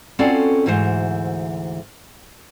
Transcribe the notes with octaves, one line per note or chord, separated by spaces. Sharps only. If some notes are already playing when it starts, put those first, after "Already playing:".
C4 C#4 F4 F#4 A4 D5
D2 G#2 E3 F#4 C5